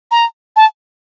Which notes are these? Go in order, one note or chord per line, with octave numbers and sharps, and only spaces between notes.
A#5
A5